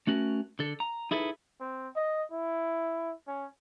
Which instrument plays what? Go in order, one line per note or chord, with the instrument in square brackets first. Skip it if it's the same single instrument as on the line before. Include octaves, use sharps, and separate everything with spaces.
[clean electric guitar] A3 C#4 F#4 A#4
D3 A4
A#5
D#4 E4 G#4 A4 B4
[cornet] C4
D#5
E4
C#4